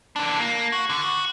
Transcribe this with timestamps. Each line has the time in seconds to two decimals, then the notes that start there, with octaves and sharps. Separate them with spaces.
0.16 E3 D4
0.39 A#3
0.72 F#4
0.90 D3
1.01 F#4